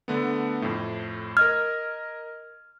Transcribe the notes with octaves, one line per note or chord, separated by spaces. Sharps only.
D3 A3 B3
F2 A2
A#4 D#5 F6 G#6